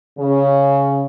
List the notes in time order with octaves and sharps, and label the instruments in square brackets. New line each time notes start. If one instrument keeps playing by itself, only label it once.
[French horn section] C#3